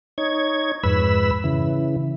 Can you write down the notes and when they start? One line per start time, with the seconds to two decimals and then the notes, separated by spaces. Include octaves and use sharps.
0.18 D#4 C#5 G#6
0.83 F2 G#2 B4 B5 E6
1.44 C#3 E3